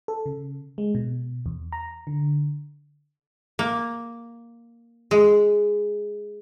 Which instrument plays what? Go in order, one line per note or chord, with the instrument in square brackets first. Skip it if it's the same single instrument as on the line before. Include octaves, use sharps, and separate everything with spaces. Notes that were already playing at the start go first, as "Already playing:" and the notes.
[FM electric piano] A4
C#3
G#3
B2
E2
A#5
D3
[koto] A#3
G#3